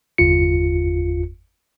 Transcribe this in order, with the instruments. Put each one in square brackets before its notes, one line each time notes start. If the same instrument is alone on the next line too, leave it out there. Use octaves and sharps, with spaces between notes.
[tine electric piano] G1 E2 F4 C#7